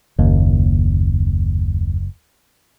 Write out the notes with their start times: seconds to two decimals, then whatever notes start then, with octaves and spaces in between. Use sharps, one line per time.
0.19 F#1 D#2